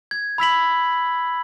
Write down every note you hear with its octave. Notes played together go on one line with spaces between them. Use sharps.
G#6
B5 E6 B6 F#7